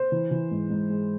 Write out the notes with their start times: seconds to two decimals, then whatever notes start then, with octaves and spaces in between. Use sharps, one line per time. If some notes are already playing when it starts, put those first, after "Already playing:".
Already playing: C5
0.12 E3
0.31 E3
0.51 G#2
0.70 G#2
0.90 G#3